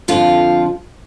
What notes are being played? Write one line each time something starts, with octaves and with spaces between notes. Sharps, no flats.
F2 D3 F3 F4